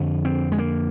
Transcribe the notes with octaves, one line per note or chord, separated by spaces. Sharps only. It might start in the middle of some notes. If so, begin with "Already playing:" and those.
Already playing: F2 D3
C4
G#3
A#3